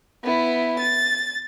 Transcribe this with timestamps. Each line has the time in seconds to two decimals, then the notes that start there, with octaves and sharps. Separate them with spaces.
0.24 B3 E4
0.79 A6